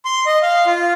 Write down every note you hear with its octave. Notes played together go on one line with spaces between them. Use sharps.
C6
D#5
F5
F4